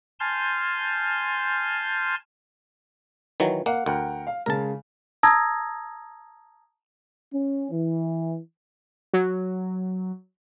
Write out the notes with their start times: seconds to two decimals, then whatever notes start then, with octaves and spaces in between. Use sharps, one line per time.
0.20 G#5 A5 C6 F6 G6
3.40 D#3 E3 F#3
3.66 A#3 F5 F#5
3.86 D2 A#4 F#5 G5
4.27 F5
4.46 C#3 G#3 A#4 A5
5.23 A5 A#5 D#6 E6 G#6 A#6
7.33 C#4
7.71 E3
9.14 F#3